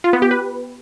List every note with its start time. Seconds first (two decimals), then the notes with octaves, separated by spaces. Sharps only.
0.04 F4
0.13 B3
0.22 G4
0.31 B4